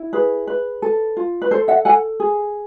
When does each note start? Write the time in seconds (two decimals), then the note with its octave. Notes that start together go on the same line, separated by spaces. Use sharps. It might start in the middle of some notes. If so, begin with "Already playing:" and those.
Already playing: E4
0.13 G#4 B4
0.47 B4
0.82 A4
1.17 F4
1.42 B4
1.51 A4 C5
1.68 E5 F#5
1.85 A4 F#5 G#5
2.20 G#4